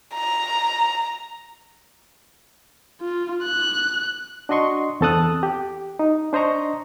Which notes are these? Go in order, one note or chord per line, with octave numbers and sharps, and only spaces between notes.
A#5
F4
F#6
D4 F#4 D#5 C6 C#6
E2 C4 A4 A5 D#6 F#6
G4
D#4
D4 C5 D#5 A#5 C#6